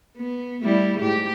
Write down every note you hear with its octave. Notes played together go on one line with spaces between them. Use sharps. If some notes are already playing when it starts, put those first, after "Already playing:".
B3
G3 A3 E4
G#2 G4